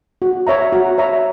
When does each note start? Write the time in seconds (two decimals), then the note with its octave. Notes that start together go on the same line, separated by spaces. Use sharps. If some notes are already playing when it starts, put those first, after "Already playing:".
0.22 F#4
0.47 C#5 E5 A#5
0.73 F#4
0.98 C#5 E5 A#5